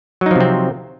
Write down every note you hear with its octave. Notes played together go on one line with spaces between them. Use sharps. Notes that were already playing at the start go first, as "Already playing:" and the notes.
C3 F3 F#3 C4 D#4